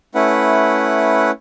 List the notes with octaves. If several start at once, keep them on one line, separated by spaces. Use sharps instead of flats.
A3 C#4 E4 B4 F#5